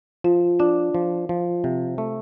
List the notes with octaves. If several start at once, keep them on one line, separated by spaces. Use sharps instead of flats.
F3 F4
D4 F4
F3
F3
C3
A3